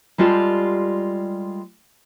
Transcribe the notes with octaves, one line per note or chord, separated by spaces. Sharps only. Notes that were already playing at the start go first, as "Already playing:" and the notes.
G3 G#3 F4 G4 A4